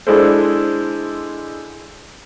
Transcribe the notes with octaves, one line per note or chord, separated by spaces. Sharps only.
G#3 D4 E4 G#4 A4 C5